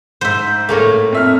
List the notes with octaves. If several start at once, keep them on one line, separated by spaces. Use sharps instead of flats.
G#2 C5 E5
A2 A3 A#3
F2 E5 F6